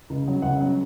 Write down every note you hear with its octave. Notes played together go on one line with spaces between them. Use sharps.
C#2
C#3 F#3
C#2 F#5
C#3 F#3